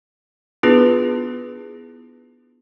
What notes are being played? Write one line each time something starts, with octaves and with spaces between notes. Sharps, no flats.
B3 D4 E4 F4 G#4 B4